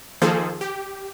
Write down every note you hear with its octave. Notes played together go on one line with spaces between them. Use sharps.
D#3 F3 A#3 G#4 A4 C5
G4